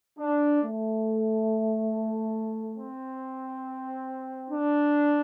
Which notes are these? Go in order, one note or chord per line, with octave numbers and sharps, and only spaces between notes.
D4
A3
C4
D4